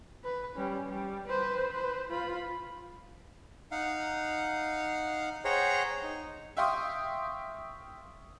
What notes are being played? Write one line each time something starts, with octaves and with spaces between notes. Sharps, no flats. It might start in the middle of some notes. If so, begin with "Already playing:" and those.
B4
G3 C#4
G3
B4 C5
B4 C5
F4 B5
D#4 F5 F#5
G#4 C5 C#5 F#5 G5 A#5
D#4
E5 F5 G5 C6 C#6 D#6